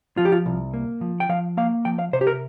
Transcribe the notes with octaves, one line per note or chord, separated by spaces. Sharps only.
F3 F4
G4
F4
C2
A#3
F3
G5
F3 F5
A#3 F5
F3 G5
F5
C3 C5
G4
A#4